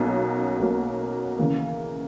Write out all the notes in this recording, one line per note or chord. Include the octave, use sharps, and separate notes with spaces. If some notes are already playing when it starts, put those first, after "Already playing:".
Already playing: B1 B2 F#3 A#3 C#4
B1 B2 F#3 A#3 C#4
C#3 E3 A#3